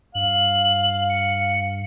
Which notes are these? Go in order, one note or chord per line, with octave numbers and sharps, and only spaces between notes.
G2 F5 F#7
C#7